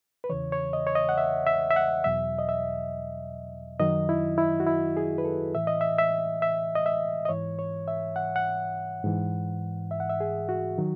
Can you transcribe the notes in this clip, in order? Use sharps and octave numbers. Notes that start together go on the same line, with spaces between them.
B4
E2 C#3 E3 C#5
C#5
D#5
C#5
D#5
F#5
E5
E5
E5
F#5
E2 B2 F#3 E5
D#5
E5
F#2 D#3 F#3 D#5
E4
E4
F#4
E4
G#4
B4
A4
A2 E3 E5
D#5
E5
E5
E5
D#5
E5
D#5
G#2 E3 C#5
C#5
E5
F#5
F#5
G#2 E3
E5
F#5
E5
G#4
F#4
D#3 F#3